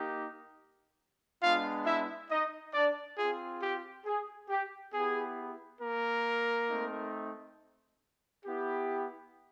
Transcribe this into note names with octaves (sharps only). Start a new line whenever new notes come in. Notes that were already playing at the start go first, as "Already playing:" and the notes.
Already playing: A#3 D#4 G4
G#3 B3 D4 F4 F5
E4 E5
D#4 D#5
D4 D5
C4 F4 G#4
G4
G#4
G4
B3 E4 G4 G#4
A#3 A#4
A3 C4 D#4
B3 E4 G4